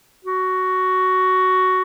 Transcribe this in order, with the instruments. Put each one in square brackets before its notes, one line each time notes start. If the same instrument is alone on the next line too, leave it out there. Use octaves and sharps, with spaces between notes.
[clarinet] F#4